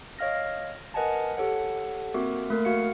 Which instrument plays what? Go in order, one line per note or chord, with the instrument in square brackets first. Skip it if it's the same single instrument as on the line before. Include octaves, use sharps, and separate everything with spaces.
[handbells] C#5 D#5 F5 F6 A#6
A#4 B4 D#5 F#5 G#5 A5
G4 A4 C#5 F#5
A#3 C4 F#4 A#4 E5 D6
A3 A#3 A#4
F#4 F5 C#7